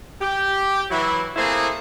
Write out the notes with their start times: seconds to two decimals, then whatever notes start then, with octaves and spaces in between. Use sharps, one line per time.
0.20 G4
0.90 E3 F#3 E4
1.36 A3 A#3 C4 E4 G#4